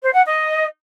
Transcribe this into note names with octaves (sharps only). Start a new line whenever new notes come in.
C5
F#5
D#5